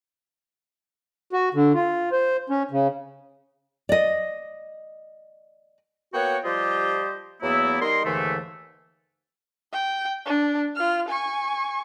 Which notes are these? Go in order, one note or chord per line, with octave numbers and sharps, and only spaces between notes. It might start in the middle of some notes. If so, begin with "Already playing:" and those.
F#4
D3
F4
C5
C#4
C#3
D5 D#5
A#3 B3 F#4 C#5 F#5 G5
F3 G3 F4 G4 C5 D#5
E2 F#3 A#3 B3 E4
G3 D#4 A#4 D#5 C6
D#2 G#2 D3 E3 A3
G5
D4
F4 F6
G#5 C#6